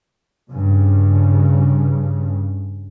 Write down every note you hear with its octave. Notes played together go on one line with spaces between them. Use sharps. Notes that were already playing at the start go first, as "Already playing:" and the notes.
G2 C#3